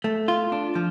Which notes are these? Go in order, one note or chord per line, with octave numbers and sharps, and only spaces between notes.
A3
F4
D4
F3